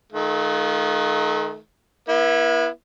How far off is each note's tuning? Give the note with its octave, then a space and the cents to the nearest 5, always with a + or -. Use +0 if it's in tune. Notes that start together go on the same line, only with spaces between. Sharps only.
D#3 +0 A3 -40 F4 +0
B3 -40 E4 +0